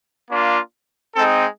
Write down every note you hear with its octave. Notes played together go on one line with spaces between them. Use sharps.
A#3 D4 F4
G#3 C4 D#4 A4